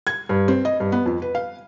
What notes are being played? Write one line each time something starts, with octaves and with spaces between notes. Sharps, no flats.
G#6
G2
C4
D#5
G2
B3
F2
B4
F5